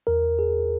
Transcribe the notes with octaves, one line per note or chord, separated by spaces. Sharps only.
E2 A#4
G#4